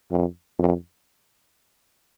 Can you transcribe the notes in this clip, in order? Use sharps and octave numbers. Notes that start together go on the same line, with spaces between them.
F2
F2